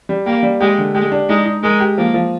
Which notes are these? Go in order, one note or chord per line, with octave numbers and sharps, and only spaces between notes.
G3
A#3 G4
G3
G#3 G4
D3
G#3 G4
D4
G#3 D#4
D#4
G#3 A#4
G4
F3 A#3
F3